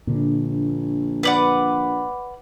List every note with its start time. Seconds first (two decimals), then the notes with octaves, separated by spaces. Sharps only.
0.07 A#1 A#2 D3
1.23 B4 D5 F#5